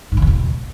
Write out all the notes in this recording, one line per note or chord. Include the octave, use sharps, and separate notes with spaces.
G#2
C#3
E2
B2